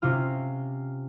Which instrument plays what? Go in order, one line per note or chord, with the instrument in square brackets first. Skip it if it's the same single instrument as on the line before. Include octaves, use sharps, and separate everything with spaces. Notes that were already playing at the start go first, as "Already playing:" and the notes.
[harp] C3 C#4 F4 F6